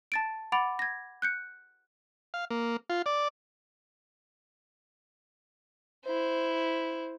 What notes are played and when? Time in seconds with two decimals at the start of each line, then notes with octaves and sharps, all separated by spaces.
0.12 A5 A6 D7
0.52 F#5 B5 D6 A6 D7 F7
0.79 G#6 A#6
1.22 F#6 G6 C#7
2.34 F5
2.51 A#3
2.90 F4
3.06 D5
6.05 E4 C5